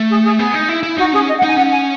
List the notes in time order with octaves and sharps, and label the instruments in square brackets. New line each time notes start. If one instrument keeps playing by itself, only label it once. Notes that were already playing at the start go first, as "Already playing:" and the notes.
Already playing: [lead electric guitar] A3
[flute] G#4
G#4
[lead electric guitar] B3 [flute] G#4
[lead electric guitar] D#4
E4
E4
[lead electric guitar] D#4 [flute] F#4
[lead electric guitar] C#4 [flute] G#4
[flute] D#5
F#5
[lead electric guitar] D#4 [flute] G#5
[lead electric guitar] C#4 [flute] F#5
[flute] G#5